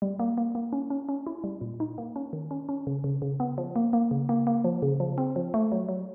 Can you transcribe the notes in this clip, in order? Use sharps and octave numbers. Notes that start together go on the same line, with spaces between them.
G3
A#3
A#3
A#3
C#4
C#4
C#4
E4
G3
A#2
D#4
A#3
C#4
D#3
C#4
C#4
C#3
C#3
C#3
B3
F3
A#3
A#3
C#3
A#3
A#3
F3
C#3
F3
C4
F3
A3
F#3
F#3